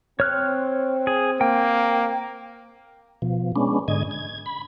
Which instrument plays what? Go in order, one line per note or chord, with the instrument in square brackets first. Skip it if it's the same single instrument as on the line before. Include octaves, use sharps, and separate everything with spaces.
[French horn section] C4 [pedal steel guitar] C#5 F6 F#6
[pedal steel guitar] G#4
[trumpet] A#3 [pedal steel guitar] G5
[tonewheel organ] B2 F3
G#3 B3 C#4 D4
G#2 D3 D#5 G#6
G#6
B5